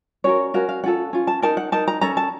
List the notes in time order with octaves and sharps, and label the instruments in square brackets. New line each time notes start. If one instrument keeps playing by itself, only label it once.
[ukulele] C#4 F#4 A#4 C#5
C#4 F#4 A#4 F5
F5
C#4 F4 A4 F#5
C#4 F4
A5
D#4 A#4 A5
F#5
D#4 A#4 A5
A#5
C#4 A4 A#5
A5